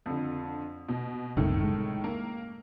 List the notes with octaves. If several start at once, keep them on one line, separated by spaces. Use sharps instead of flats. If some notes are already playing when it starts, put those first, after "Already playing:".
F2 D3
B2
F#1 C2 A2 D#3 A3
G#3
A#3